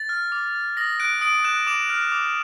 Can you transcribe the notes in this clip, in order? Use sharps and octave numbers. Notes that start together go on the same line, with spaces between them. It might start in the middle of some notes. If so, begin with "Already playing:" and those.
Already playing: A6
F6
D6
F6
D#6 A#6
F#6 D7
D#6 D7
F#6 E7
D6 E7
F6
D6